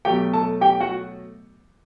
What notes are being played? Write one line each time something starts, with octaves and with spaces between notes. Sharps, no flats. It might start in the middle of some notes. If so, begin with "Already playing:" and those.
B2 F#3 A3 G4 G5
A4 A5
G4 G5
F#4 F#5